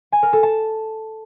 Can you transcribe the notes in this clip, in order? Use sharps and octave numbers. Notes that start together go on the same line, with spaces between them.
G#5
A#4
A4
A5